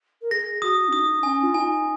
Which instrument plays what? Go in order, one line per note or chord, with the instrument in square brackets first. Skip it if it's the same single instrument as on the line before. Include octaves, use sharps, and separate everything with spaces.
[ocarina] A#4
[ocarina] G#4 [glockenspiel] A#6
[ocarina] F#4 [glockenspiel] D#6
[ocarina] C#4
[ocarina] D#4 [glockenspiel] D#6
[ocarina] C#4 [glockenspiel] G#5
[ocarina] F4
[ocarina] D#4 [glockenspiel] G#5